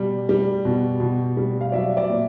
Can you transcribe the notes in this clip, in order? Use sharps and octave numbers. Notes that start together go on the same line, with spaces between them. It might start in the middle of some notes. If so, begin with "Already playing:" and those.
Already playing: B2 G3
G3
B2
B2
G3
F5
F#3 D5 E5
D5 E5
A#2